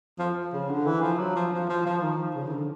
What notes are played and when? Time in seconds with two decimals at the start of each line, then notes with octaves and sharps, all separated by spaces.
0.19 F3
0.53 C#3
0.70 D3
0.86 E3
1.02 F3
1.19 F#3
1.36 F3
1.53 F3
1.69 F3
1.86 F3
2.02 D#3
2.35 C#3
2.47 D#3
2.51 D3